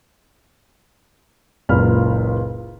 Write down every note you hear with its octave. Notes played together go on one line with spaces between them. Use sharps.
F#1 C#2 A#2 B5 F6